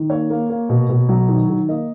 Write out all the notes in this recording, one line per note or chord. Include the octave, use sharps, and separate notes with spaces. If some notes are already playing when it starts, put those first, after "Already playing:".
Already playing: D#3
A#3 C#5
A#3
A#3
B2
B2
F#3
D#3
D#3
A#3 D#5